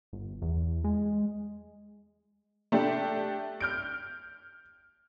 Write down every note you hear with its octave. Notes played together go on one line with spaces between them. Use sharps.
G1
E2
G#3
A3 D4 G4
F6 G6 D7